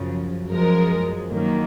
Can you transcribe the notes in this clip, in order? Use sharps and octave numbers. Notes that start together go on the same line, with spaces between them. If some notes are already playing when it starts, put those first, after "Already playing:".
Already playing: F#2 C#3 F3
F#2 F3 G#3 A#4
F#2 D#3 F#3 A#3